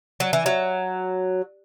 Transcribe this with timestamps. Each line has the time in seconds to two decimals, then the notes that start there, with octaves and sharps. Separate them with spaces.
0.20 F#3
0.33 E3
0.46 F#3